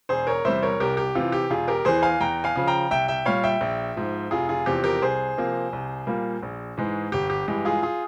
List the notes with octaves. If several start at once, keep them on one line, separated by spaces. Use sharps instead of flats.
E1 G#4 C5
A#4 C#5
E2 C3 G3 C5 E5
A#4 C#5
C2 G4 A#4
G4
C3 E3 F4
G4
E1 F4 G#4
G4 A#4
E2 E3 G#4 C5
F5 G#5
E2 G5 A#5
F5 G#5
C#3 F3
G5 A#5
C2 E5 G5
E5 G5
A#2 G3 C#5 F5
E5 G5
A#1
G#2 F3
F1 F4 G#4
F4 G#4
E2 C3 F3 G4
G4 A#4
C2 G#4 C5
C3 F3 A#3
C2
A#2 G3 A#3
A#1
G#2 E3 G#3
G1 G4
G4
G2 E3 G#3 G4
F4 G#4
F4 G#4